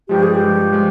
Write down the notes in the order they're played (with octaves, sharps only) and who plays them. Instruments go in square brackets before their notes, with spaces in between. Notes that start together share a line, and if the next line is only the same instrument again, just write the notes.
[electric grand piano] G2 F3 G#3 [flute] G4
[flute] G#4
G4
[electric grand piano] G2 F3 G#3
F3 G#3